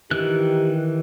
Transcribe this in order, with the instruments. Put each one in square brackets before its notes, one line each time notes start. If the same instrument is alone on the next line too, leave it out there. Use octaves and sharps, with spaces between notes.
[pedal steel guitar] D#3 E3 F#6 [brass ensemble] D#4 G4